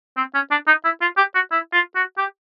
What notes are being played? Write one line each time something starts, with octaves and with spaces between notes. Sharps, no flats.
C4
C#4
D4
D#4
E4
F4
G4
F#4
E4
F4
F#4
G4